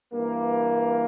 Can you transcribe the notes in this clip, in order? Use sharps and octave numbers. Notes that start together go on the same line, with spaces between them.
G2 E3 A#3